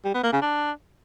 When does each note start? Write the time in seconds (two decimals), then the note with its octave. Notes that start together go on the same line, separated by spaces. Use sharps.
0.05 G3
0.14 B3
0.23 A#3
0.33 C#3
0.42 D4